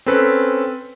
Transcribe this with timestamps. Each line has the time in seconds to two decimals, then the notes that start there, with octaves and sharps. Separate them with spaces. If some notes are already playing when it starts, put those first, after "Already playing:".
0.06 C4 C#4 A4 B4